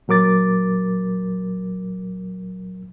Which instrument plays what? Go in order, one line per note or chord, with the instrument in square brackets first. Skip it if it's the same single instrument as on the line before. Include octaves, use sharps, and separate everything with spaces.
[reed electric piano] A#2 F#3 A#4 D6 A6